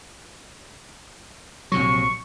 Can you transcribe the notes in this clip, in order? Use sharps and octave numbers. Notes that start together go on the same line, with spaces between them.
A#1 C3 F#3 C#6